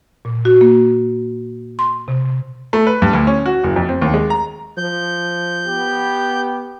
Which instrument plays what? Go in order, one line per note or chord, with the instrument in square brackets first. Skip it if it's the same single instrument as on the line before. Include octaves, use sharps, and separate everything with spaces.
[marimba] A#2
F#4
A#3
C6
C3
[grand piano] A3
B4
G2
D2
C#4
F#4
F#1
F2
C4
D#2
G#3
A#5
[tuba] F3 [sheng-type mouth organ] G6
[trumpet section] B3 G4